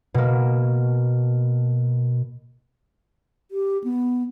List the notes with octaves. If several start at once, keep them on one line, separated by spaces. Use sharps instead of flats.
B2 A#3
G4
B3